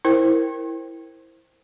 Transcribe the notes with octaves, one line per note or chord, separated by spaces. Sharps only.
E4 A#4 C5 G5